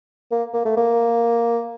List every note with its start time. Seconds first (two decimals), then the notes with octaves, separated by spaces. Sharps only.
0.31 A#3
0.54 A#3
0.65 A3
0.77 A#3